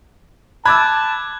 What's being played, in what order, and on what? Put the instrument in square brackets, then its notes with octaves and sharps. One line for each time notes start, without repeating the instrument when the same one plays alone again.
[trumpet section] A5 [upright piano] B5 D6 E6 [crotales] F#6 G#6